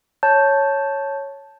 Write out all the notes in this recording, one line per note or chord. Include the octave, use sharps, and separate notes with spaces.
C#5 A5 G6